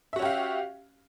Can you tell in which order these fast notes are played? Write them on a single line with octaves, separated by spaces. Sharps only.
E5 F#4 C#4 G4 F5